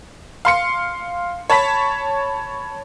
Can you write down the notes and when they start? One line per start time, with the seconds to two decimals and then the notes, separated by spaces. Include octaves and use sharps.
0.45 F5 C6 C#7
1.50 C#5 A5 B5 B6